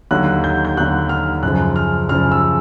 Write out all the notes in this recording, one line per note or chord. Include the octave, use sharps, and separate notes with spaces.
D#2 D3 F#3 F#6
G6
G6
D#2 D3 F#3 F#6
F6
F#2 C#3 F3 F#6
F6
F#2 C#3 F3 F6
E6